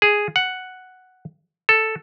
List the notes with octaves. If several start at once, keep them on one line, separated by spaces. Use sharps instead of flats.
G#4
F#5
A4